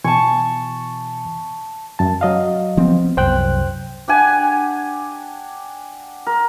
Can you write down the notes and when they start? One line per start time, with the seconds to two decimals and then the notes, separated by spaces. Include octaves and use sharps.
0.05 B2 E3 G#5 A5 C#6
1.99 F#2 A5
2.21 F#3 D#5 F5
2.77 F3 B3 C4
3.17 C2 F#2 C5 G5 F#6
4.08 D4 G4 F#5 G#5
6.27 A#4